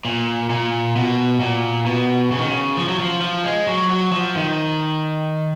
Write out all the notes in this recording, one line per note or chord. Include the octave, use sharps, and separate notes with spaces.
A#2
A#2
B2
A#2
B2
C#3
D#3
C#3
F3
F#3
F3
F3
G#3
F#3
F#3
F3
D#3